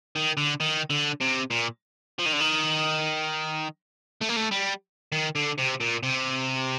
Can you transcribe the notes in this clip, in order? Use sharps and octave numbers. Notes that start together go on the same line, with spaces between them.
D#3
D3
D#3
D3
C3
A#2
F3
D#3
D3
D#3
A3
A#3
A3
G3
D#3
D3
C3
A#2
C3